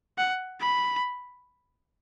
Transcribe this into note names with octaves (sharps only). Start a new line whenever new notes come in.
F#5
B5